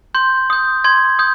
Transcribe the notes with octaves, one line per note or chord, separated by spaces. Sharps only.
C6 G6
D#6 G6
C6 G#6
D#6 G6